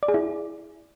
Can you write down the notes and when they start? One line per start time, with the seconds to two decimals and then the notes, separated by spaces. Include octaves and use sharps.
0.03 D5
0.08 G#4
0.14 E4